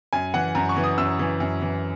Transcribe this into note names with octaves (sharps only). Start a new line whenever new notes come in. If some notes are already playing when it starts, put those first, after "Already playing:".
F#2 G#5
E3 F#5
F#2 A#5
C#6
E3
D#6
F#2 E6
E3
F#2
E3